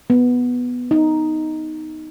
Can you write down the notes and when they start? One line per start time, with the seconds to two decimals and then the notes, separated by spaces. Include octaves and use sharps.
0.10 B3
0.91 D#4